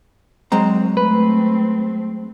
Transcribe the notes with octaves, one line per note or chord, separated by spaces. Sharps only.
F#3 G#3 C4 A#5
A3 C4 B4